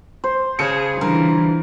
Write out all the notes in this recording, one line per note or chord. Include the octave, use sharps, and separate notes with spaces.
C5
C#3 G#4 A5 C#7
D3 E3 G3 F4 A#4